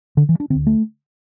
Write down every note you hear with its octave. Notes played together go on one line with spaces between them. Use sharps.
D3
E3
D4
D2 D3 C4
A3